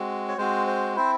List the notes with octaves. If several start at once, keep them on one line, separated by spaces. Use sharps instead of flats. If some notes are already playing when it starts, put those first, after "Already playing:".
Already playing: G#3 C4 F#4
C#5
G#3 C4 F#4 C5
C5
C4 E4 C5